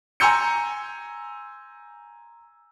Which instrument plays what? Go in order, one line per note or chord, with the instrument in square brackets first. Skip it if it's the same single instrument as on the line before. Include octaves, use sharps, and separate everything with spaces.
[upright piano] G#5 A#5 C6 E6 G6 C#7